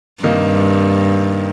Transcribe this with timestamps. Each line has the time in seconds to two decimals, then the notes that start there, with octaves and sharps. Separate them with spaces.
0.23 G2 C3 D#3 A#3 D#4